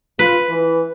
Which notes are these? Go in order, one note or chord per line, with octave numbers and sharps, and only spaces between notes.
F4 B4
E3